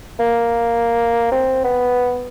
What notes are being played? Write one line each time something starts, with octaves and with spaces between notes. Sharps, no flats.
A#3
C4
B3